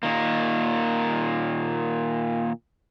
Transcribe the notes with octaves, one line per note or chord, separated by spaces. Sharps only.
A#2 D#3 A#3